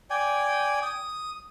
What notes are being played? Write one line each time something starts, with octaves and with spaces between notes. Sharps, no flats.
D5 G5 G#5
D#6